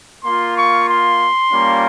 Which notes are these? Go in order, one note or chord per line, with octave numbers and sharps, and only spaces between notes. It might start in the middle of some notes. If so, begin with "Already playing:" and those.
A#3 F4 C6
C#6
C6
G3 A#3 C#4 F4